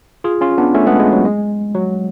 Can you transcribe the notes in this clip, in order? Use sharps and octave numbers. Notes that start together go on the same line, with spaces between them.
F4 G#4
C#4 F4
B3 D4
A3 C#4
G#3 B3
G#3
F#3
G#3
F#3